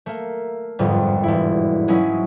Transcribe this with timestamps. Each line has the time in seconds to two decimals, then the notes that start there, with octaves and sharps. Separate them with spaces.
0.06 A3 A#3
0.79 G1 F2 G#2 G3
1.24 E1 E4
1.88 F#3 G#3 C#4 D#4 E4